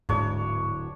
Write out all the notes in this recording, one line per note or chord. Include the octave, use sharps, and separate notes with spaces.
D1 G#2 D4 C#5